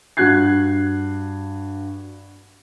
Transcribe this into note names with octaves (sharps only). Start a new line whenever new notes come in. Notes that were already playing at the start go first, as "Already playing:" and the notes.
G2 F#4 F#6 G#6 C7